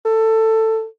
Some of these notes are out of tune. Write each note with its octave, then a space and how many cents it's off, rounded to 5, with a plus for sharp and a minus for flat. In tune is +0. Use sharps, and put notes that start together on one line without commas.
A4 +15